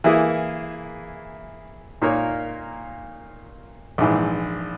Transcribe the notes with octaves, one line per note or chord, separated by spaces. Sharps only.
E3 A#3 E4 G#4
A#2 A#3 D#4 A#4 C#5
A#1 G#2 E3